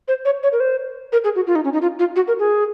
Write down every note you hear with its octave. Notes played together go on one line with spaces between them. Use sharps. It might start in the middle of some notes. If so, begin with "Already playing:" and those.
C5
C#5
C#5
A#4
C5
A#4
G#4
F#4
F4
D#4
C#4
D#4
F4
F4
F#4
A#4
G#4